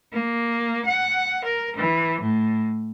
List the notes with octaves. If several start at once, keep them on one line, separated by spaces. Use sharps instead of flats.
A#3
F#5
A#4
E3
A2